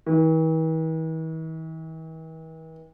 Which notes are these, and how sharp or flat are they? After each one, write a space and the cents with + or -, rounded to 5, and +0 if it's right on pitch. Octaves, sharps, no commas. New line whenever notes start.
E3 -45